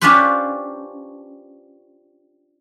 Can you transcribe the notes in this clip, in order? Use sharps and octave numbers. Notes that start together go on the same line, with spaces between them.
C#4 D4 F4 G4 B4 C5